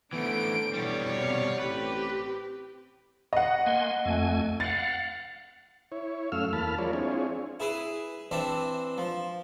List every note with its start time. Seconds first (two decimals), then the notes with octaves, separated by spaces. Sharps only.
0.13 D3 E3 A3 B3 C5 D7
0.74 B2 E3 G3 C#5 D5
1.18 C3 F5
1.60 A1 C4 G4 B4
3.33 D#5 F#5
3.66 A#3 G#5 C6
4.05 F2 A3 G#5
4.60 F5 F#5 A6
5.92 E4 C#5
6.32 F#2 A3 C#4 F5 E6 F6
6.53 E2 A#3 A5 B5 F6
6.78 F3 G#3 F4 A#4 C#5 D5
6.93 C4 D4 E4 F4 G#4 C#5
7.60 E4 G#4 B4
8.31 E3 C4 D4 E5
8.98 F3